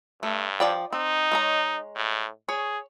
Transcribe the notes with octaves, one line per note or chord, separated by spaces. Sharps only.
G2 A3
F3 D5 G5
C4 D#4
G#3 C#5 A#5
A2
G#4 C#5